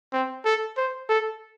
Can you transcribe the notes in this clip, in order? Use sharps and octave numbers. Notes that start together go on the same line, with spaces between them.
C4
A4
C5
A4